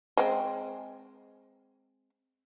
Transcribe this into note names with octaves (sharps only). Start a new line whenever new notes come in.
G#3 C4